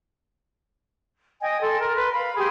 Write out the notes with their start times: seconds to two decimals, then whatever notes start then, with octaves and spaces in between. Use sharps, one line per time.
1.41 D#5 G5 G#5
1.61 A4 C6
1.81 A#4
1.95 B4 C6
2.13 F5 B5
2.37 G4 G#4 C6